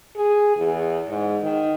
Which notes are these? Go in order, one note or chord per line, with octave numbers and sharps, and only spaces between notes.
G#4
E2
G#2
D#3